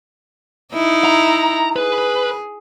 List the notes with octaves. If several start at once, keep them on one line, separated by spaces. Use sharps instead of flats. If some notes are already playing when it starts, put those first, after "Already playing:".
D#4 E4
A#5
G#4 B4